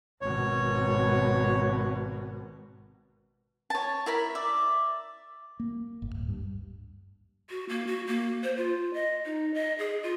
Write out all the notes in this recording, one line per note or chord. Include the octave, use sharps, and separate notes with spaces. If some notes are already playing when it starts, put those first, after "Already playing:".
G#1 B2 C#5
C#5 A5
E4 A#4 B5
D5 E5
A#3
G1
D1
G2
F#4
A#3
F#4
A#3
C5
F4
D#5
D#4
D#5
G#4
F4